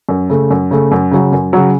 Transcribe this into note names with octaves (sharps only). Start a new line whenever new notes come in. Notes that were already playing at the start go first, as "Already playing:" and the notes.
F#2
C#3 A3
F#2
C#3 A3
F#2
C#3 F#3
F#2
C#3 F#3